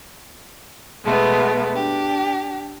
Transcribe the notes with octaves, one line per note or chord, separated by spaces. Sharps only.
B2 G#3 A3 B3
D4 G4